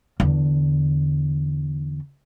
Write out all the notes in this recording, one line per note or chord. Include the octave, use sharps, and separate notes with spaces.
E2 D3